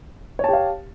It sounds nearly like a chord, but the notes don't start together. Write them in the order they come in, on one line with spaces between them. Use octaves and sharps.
C#5 A5 G4 F5